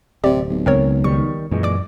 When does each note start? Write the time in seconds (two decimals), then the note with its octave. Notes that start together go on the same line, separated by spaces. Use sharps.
0.24 D1 C3 G4 D5
0.50 B1
0.66 C#2 C4 A#4 C#5
1.04 D#3 G3 C#6
1.51 F#2 A#2 E3 G#3
1.63 D5 D6